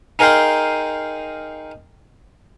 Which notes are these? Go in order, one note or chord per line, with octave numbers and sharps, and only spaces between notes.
D#4 G#4 A#4 F5 G5 C6